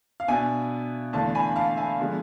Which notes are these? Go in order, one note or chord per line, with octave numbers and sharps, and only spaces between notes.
F5
B2 B3 D4 E5 G#5
E2 D3 A3 D4 F5 A5
G#5 B5
F5 A5
E5 G#5
D3 F3 G#3 B3